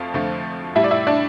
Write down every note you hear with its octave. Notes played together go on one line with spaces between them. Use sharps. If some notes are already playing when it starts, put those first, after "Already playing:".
Already playing: F2 F3 A3 F4
F2 D3 F3 A3
A2 G3 E4 E5
D5
E4 E5
D4 D5